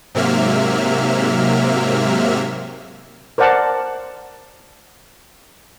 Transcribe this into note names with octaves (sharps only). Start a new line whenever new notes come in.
G#2 C3 F#3 A#3 E5 F6
A#4 C5 D5 F#5 A5